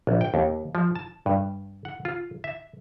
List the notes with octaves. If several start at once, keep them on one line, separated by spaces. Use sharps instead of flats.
A#1
G5
D#2
F3
A5
G2
F#5
F4
E5